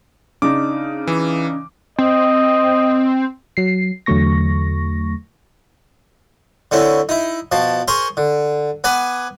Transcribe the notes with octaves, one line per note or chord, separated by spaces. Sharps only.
C#3 D4 D#4 D6
E3
C4 D#5
F#3 C7
E2 D3 F#3 A3 C#6 A#6
D3 C4 C#4 E4
D#4 E4
B2 F3 A5
G#4 A#4 C5 C6 C#6
D3
B3 B4 G#5 B5 D6